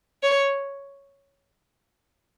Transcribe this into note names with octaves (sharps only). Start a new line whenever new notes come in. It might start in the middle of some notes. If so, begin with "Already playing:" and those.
C#5